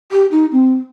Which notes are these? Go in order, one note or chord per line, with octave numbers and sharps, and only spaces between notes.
G4
D#4
C4